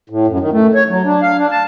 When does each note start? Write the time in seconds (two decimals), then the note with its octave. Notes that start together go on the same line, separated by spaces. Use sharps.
0.10 A2
0.27 F#2
0.40 D#3
0.52 A3
0.75 C#5
0.89 F#3
1.05 D4
1.22 F5
1.38 D4
1.51 A5